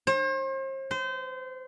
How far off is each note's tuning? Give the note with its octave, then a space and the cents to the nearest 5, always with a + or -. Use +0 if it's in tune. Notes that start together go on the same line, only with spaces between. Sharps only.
C5 +40
C5 -30